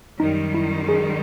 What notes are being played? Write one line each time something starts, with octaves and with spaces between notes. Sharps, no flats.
F#2 D#3 G3 D#4
E4
G#4